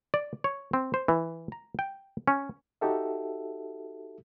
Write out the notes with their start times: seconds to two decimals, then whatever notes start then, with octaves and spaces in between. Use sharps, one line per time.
0.14 D5
0.44 C#5
0.73 C4
0.94 C5
1.08 E3
1.52 A#5
1.79 G5
2.28 C#4
2.81 D#4 F#4 G4 A4 E5